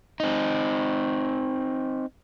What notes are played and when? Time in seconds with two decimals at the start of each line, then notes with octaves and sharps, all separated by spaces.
0.20 C4 D#4